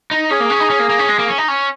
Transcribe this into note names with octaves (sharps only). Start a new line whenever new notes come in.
D#4
C#4 G#4
A#3
C#4
D#4
C#4
A#3
A#3
C#4
G#3
A#3
C#4
D#4
C#4